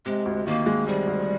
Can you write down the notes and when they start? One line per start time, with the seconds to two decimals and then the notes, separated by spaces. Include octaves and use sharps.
0.06 C3 G#3
0.26 D2
0.47 D#3 A#3
0.66 G#3
0.87 C3 G3
1.07 D2